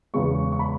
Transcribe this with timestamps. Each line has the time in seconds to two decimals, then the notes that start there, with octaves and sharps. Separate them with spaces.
0.14 E2 C#3 G#3 B3 C#6
0.52 C#6
0.59 B5